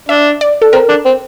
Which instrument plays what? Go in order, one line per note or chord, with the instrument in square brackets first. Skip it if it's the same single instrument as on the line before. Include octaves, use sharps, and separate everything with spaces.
[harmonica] D4 [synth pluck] E5
[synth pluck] D5
A4
[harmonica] C4 [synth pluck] A#4
[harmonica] D4
C4